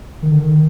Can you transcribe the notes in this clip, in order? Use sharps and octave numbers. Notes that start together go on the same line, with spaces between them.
D#3
D3
D#3